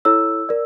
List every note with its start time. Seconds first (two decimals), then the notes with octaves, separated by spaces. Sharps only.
0.05 E4 A4 C#5 E6
0.49 A#4 D5